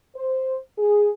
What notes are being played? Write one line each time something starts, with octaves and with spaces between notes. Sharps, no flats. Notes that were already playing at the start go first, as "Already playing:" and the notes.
C5
G#4